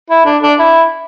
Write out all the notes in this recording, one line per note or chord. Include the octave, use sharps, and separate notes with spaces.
E4
D4
D4
E4